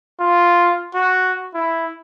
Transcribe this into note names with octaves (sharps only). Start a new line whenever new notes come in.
F4
F#4
E4